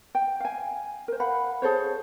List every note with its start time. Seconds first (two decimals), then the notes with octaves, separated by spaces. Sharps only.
0.15 G5
0.40 F5 G#5
1.08 A#4 C5
1.20 F5 F#5 B5
1.62 G#4 A4 C5 C#5